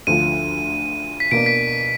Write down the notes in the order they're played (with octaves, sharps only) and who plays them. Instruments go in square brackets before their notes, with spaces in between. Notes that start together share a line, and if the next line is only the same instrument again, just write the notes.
[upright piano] D2 D3 F3 [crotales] D#7
[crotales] B6
[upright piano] B2 A#3 D4 [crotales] D7
[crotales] B6